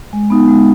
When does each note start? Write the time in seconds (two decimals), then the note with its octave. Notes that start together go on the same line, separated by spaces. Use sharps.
0.13 G#3
0.30 B3 D#4
0.48 G#3